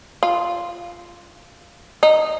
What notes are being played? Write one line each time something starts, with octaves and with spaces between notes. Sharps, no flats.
F4
D#4